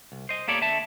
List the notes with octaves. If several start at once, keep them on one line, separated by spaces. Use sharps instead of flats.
C2
C5 D#5
A#3 B3 G4 A4 C#5 D5
D3 E5 A5